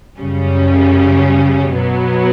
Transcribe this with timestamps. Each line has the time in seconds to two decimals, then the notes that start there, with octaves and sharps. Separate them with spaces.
0.19 F#2 C#3 G3 C#4
1.78 B2 F#3 B3